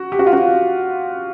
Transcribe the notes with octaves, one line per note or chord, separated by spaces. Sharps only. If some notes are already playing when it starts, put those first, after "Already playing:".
Already playing: F#4
G4
F#4
F4
F#4